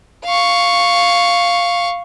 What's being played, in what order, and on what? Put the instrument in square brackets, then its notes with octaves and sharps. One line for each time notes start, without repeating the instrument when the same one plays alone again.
[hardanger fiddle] F5 C#6